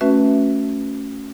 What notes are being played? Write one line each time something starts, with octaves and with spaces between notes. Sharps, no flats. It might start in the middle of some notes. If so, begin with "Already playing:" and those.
A3 C#4 F#4 B4 E5